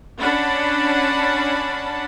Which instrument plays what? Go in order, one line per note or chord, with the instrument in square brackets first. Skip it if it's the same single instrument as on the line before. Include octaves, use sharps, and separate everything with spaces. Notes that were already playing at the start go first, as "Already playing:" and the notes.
[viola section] C#4 D4 F#5 A5 B5